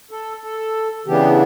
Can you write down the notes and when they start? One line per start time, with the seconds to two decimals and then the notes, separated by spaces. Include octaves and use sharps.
0.11 A4
0.44 A4
1.07 C#3 E3 B3 D4 G4